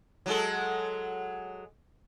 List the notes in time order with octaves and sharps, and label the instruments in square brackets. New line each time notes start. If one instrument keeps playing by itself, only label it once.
[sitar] F#3 G#3 A4